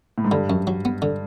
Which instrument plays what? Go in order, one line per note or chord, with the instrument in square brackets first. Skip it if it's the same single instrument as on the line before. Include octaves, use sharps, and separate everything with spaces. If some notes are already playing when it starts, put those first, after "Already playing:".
[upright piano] A2
G#2
[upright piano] G2 [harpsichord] D3
[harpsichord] F#2
F#3
B3
D3